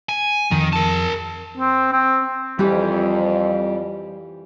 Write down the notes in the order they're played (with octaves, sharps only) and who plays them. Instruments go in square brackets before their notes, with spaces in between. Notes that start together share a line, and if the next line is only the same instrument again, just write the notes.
[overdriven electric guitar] G#5
[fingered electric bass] F2 [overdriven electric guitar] D#3
[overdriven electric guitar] A#4 A5
[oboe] C4
C4
[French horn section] F2 [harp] E3 G4 [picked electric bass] G3